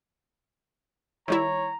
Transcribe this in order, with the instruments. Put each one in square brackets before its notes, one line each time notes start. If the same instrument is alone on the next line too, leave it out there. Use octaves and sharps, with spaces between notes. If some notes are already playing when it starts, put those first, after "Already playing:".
[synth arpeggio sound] D#3 G3 E4 [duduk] C#5 [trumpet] A#5